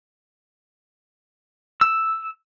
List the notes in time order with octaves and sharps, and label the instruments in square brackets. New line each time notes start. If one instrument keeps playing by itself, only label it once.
[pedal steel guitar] E6